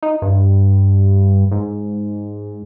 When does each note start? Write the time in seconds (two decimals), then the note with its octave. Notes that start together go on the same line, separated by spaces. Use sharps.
0.03 D#4
0.22 G2
1.52 G#2